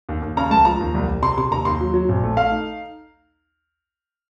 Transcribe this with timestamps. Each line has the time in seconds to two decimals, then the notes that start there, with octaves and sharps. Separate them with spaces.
0.09 D#2
0.22 D#2
0.37 C#3 A#5
0.51 C#2 A5
0.65 F3 A#5
0.80 D#2
0.95 C2
1.08 C2
1.22 C3 C6
1.38 C3 C6
1.51 D#2 A#5
1.65 D#2 C6
1.81 F#3
1.94 F#3
2.09 A#1
2.23 A3
2.37 A3 F5
2.51 D#4